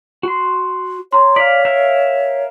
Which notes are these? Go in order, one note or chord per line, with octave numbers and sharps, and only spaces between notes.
F#4 C6
C#5 A#5 C6
D5 F5 B6
A#4 E5 F5